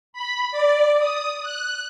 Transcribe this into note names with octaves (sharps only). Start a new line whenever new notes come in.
B5
D5
D#6
F#6